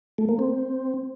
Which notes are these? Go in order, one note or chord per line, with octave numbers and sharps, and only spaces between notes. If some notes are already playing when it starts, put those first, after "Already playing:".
A3
A#3
C4